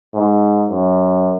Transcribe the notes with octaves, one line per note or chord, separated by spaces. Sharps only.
G#2
F#2